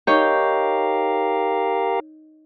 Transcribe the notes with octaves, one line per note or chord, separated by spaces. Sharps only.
D#4 G4 A#4 C#5 F5 G6